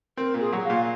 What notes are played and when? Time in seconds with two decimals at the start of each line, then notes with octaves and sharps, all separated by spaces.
0.17 C4 A#4
0.34 A#2
0.40 G#4
0.52 F#3
0.64 F5
0.70 A#2